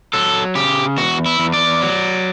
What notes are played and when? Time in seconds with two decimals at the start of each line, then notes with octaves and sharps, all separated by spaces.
0.13 F#3 A4
0.55 C#3 G4
0.97 E2 F#4
1.26 E4
1.39 E2
1.53 D5
1.82 F#3